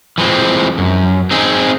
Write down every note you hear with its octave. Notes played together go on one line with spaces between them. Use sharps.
E3 F3 G#3 C4
F#2
C4 D#4 G#4